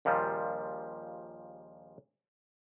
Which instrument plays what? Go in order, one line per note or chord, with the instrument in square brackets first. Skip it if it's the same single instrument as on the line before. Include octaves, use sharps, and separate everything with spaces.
[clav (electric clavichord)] A#1 D#2 A#2 F3 G3